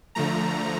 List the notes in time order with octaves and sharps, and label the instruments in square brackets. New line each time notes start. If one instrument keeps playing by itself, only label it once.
[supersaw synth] D3 F3 A3 A#5